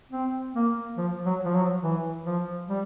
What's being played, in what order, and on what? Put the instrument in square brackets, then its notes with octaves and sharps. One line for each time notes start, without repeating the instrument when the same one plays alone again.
[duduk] C4
A#3
F3
F#3
F3
F#3
E3
F3
G3